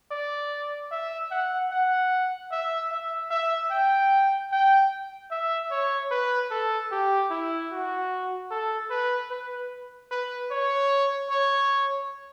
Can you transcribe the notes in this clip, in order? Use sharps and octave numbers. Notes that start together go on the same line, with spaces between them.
D5
E5
F#5
F#5
E5
E5
E5
G5
G5
E5
C#5
B4
A4
G4
E4
F#4
A4
B4
B4
B4
C#5
C#5